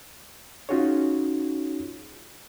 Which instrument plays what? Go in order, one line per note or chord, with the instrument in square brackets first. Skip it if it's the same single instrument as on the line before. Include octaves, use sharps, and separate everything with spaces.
[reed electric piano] C#4 D#4 F4 F#4 G#4 C#5